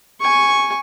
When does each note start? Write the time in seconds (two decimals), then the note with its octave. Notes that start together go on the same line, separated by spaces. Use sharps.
0.21 G#5 C#6